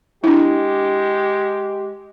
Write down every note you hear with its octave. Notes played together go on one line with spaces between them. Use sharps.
G#3 D4 E4 G4